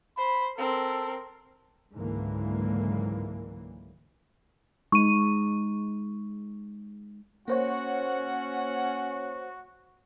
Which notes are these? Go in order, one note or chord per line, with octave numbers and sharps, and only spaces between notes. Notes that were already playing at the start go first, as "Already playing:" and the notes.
C5 B5
C4 A4 A#4
C#2 G#2 D3 E3 F#3 A#3
G#3 D#4 C#6 D#7
A#3 C#4 F#4 C5 C#5 F#5